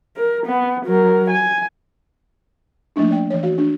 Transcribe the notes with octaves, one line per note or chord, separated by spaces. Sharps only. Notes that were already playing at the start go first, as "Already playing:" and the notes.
A#4
B3
F#3 A#4
G#5
F3 A3 A#3 D4 D#4
C#4 D5 G5
E3 C#5
F#4 F5
D4